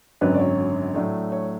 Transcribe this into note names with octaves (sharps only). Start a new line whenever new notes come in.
G#1 F#2 D3 F#3 C#4 B4
D5
C#5
A2 F#3 A3 D4
C#5